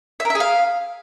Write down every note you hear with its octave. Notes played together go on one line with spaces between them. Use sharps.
E5
A#4
E5
G#4
F5